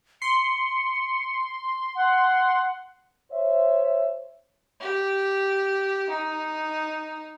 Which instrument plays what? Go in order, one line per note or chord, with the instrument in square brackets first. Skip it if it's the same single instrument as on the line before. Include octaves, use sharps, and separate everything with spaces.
[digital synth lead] C6 [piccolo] C#7
[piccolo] F#5
[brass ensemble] C5 C#5 E5
[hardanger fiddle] G4
D#4